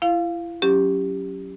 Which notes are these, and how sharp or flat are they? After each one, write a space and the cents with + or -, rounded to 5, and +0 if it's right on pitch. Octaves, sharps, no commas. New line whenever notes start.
E4 +35 F5 +0
F#3 +0 C#4 +0 G4 +0